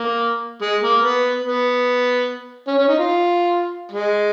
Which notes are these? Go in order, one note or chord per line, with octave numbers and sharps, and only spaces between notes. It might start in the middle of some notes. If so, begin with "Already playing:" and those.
Already playing: A#3
G#3
A#3
B3
B3
C#4
C#4
D#4
F4
G#3